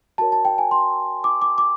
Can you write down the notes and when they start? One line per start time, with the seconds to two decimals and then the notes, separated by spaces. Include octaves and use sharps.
0.18 F#4 A#4 C#5 A5
0.32 A5
0.45 G5
0.58 G#5
0.71 C6
1.24 D6
1.42 D6
1.58 D6